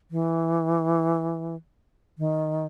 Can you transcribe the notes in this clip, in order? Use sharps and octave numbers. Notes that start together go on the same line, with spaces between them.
E3
D#3